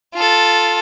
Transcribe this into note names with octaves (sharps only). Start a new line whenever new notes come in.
F4 A4